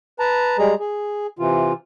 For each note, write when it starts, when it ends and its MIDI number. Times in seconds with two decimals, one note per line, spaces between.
0.19 0.57 71
0.19 0.57 81
0.19 0.57 82
0.58 0.75 55
0.58 0.75 56
0.58 0.75 68
0.58 0.75 82
0.79 1.27 68
1.39 1.73 48
1.39 1.73 52
1.39 1.73 65